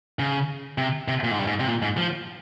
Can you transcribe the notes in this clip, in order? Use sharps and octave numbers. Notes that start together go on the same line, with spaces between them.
C#3
C3
C3
A#2
G#2
G2
G#2
C3
A#2
G#2
F3